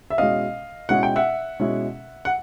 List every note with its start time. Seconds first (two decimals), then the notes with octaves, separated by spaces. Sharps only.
0.10 E5
0.18 B2 G#3 C#4 E4 D#5 F5
0.89 B2 G#3 C#4 E4 F#5
1.03 G5
1.16 E5 F#5
1.60 B2 G#3 C#4 E4
2.25 F#5